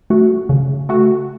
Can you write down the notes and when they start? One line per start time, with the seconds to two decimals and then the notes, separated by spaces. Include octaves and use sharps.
0.10 A3 F#4
0.49 C#3
0.89 A3 F#4